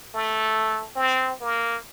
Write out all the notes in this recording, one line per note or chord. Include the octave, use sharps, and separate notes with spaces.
A3
C4
A#3